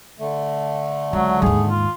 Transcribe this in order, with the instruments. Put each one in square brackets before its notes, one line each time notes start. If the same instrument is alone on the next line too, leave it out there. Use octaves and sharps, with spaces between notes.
[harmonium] D3 A3
[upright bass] C#2 [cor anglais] F#3
[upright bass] D#2 G#2 [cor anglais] G#4
[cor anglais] F4